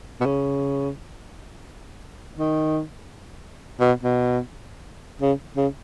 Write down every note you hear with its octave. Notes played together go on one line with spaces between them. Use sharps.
B2
C#3
D#3
B2
B2
C#3
C#3